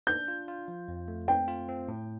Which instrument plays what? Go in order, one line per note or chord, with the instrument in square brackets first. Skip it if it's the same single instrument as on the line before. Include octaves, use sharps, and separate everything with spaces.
[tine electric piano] D4 [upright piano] G6
[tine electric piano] F4
F4
F3
F2
A3
[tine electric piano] C4 [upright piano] G5
[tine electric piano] F4
C4
A2